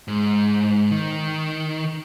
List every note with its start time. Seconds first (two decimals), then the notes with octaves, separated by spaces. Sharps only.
0.08 G#2
0.91 D#3